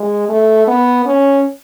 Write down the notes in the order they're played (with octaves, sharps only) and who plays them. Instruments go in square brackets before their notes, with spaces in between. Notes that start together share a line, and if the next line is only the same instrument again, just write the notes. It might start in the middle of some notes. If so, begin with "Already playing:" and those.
Already playing: [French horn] G#3
A3
B3
C#4